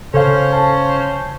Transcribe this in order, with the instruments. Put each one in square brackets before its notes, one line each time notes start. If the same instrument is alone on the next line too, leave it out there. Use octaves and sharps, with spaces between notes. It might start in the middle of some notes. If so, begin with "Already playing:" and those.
[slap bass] C#3 [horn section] C#4 C5 [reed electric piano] A4 F5
[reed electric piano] A5